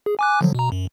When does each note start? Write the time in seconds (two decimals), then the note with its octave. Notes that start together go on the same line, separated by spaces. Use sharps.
0.06 G#4
0.19 G#5 D6 F#6
0.41 D3 F3 F#3
0.55 B2 A#5
0.72 F#2